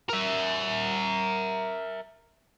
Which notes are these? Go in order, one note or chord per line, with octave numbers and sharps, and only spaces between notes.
A#4 E5